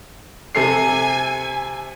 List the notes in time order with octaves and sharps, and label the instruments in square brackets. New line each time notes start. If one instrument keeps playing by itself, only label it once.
[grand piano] C3 A4 C7 [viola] G#5